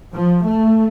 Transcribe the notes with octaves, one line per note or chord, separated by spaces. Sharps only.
F3
A3